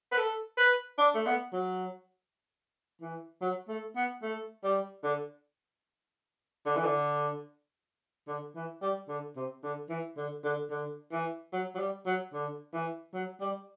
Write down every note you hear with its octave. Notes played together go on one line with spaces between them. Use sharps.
B4
A4
B4
D4
A3
B3
F#3
E3
F#3
A3
B3
A3
G3
D3
D3
E3
D3
D3
E3
G3
D3
C3
D3
E3
D3
D3
D3
E3
F#3
F#3
G3
F#3
D3
E3
F#3
G3